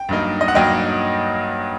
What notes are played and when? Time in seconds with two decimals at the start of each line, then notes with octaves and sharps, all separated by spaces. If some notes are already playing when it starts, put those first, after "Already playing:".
Already playing: G5
0.09 G2 F#3 A#3 D#4
0.41 D#5
0.48 F#5
0.55 G2 F#3 A#3 D#4 D#5 G5